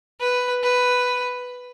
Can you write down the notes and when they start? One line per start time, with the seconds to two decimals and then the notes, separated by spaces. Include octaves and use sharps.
0.20 B4
0.63 B4